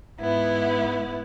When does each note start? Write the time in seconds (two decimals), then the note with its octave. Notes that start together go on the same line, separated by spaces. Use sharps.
0.19 G#2 B3 E4